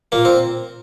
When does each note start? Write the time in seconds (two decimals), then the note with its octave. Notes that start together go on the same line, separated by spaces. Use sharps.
0.12 A#2 A#3
0.25 C4